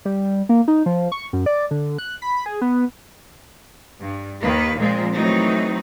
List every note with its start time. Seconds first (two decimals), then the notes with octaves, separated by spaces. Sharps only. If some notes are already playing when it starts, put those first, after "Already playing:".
0.05 G3
0.49 A#3
0.68 D#4
0.86 F3
1.12 C#6
1.33 F#2
1.46 D5
1.71 D3
1.98 F#6
2.22 B5
2.46 G#4
2.61 B3
3.99 G2
4.42 D#2 D#3 A#3 B4
4.79 A#2 F3 G#3 A#3 C4
5.14 E3 F#3 A3 C4 D#4